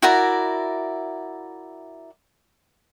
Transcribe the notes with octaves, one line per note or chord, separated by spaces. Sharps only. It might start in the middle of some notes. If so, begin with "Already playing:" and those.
E4 F#4 A#4 D5